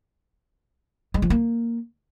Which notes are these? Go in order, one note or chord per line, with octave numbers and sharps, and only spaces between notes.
G#3
F3
A#3